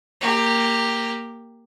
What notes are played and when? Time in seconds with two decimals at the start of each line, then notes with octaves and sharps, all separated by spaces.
0.21 A#3 G4